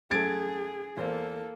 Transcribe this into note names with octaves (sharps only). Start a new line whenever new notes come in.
F#2 A3 G#4 G#6 A6 D7
E2 A#3 A4 C5